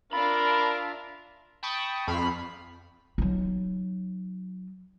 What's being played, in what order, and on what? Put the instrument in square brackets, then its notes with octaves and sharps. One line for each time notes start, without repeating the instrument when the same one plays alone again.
[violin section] D4 F5 [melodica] F4 E5 [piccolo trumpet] A#4 [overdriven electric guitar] B5
[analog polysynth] G5 A5 B5 C#6 D#6
F2 B5 F6 B6 C7
[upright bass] F#3 D#4